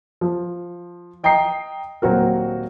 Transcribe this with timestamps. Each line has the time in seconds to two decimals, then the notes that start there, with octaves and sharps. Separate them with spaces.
0.21 F3
1.23 D#5 G5 A#5 D#6 C7
2.02 D#1 F#3 C4 F#4 A#4